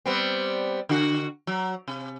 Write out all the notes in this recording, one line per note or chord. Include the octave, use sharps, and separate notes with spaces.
G3 B3 C4
D3 F#4
F#3
C3